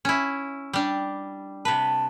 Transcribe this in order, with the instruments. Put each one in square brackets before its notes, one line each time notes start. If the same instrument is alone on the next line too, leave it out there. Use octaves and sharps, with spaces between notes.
[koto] C#4 E4
G3 D4
[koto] C3 B4 [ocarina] A5